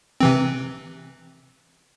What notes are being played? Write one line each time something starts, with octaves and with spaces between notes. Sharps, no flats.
C3 E3 C4